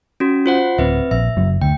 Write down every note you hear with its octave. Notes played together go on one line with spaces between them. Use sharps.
C#4 F#4
F4 C5 F#5
D1 C4 B4 E5
A#1 E5
F#1 F#3
D2 G5